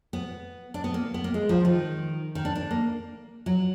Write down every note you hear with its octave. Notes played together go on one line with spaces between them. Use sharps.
B3
D4
B3
A#3
B3
A#3
G#3
F3
D#3
D#3
D4
D4
A#3
F#3